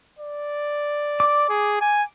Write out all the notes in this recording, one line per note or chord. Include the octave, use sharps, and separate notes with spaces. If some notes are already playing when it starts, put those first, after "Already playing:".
D5
D6
G#4
G#5